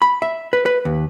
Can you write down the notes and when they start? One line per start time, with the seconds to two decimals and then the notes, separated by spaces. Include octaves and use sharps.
0.02 B5
0.22 E5
0.53 B4
0.66 B4
0.85 D#2